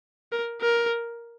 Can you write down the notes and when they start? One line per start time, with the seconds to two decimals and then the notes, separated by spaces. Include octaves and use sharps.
0.32 A#4
0.62 A#4